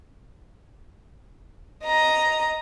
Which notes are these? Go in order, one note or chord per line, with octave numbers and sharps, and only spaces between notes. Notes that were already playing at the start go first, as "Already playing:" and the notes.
D#5 A#5